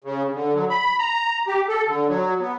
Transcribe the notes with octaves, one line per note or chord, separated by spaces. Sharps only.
C#3
D3
F#3
B5
A#5
G4
A4
D3
F#3
B3